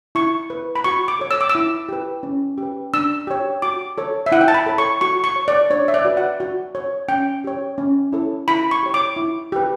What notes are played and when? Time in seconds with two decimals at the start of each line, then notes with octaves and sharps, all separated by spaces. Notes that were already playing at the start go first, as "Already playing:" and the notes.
0.15 E4 C#6
0.50 B4
0.76 B5
0.84 F#4 C#6
1.08 D6
1.19 A4 C#5
1.31 E6
1.41 D6
1.49 E6
1.55 E4
1.89 G4 B4
2.23 C#4
2.58 G4 B4
2.94 D4 E6
3.27 G4 C#5
3.62 F#4 D6
3.98 A4 C#5
4.26 E5
4.32 E4 F#5
4.41 G5
4.48 A5
4.54 B5
4.66 A4 C#5
4.78 C#6
5.01 F#4 C#6
5.24 C#6
5.36 C#5
5.48 D5
5.70 D4 C#5
5.88 E5
5.94 D5
6.05 F#4 B4
6.17 F#5
6.40 F#4
6.75 C#5
7.08 C#4 G5
7.44 G4 C#5
7.78 C#4
8.13 E4 A4 C#5
8.48 E4 B5
8.71 C#6
8.83 G4 C#5
8.94 D6
9.16 E4
9.52 G4 B4